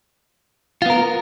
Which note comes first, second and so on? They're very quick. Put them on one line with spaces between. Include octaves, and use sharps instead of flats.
F4 B3 A#4